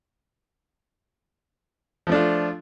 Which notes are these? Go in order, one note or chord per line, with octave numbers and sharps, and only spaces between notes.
F3 A3 D4 F4